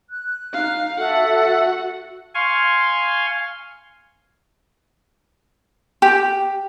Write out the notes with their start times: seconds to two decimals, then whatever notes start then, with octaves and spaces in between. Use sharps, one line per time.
0.10 F#6
0.53 D#4 F5
0.99 F#4 A4 E5 F#5
2.34 F5 G#5 C6 C#6
6.02 G4